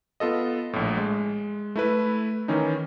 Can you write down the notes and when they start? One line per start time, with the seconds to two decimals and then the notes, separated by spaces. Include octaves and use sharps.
0.20 B3 F4 A4 D#5
0.73 A#1 A2
0.97 G#3
1.76 A3 E4 B4
2.48 D#3 E3 C#4 D#4